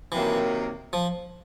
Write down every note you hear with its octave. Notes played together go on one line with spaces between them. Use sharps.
C3 D#3 E3 F#3 A#3
F3